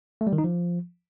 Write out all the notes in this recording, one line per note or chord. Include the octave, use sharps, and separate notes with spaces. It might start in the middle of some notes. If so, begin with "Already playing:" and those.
A3
G3
D#3
D#4
F3